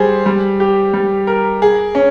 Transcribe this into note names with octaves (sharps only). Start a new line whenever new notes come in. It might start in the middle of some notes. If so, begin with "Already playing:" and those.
Already playing: G3 G#4 C5
G3
G4
G3
A#4
G#4
C#4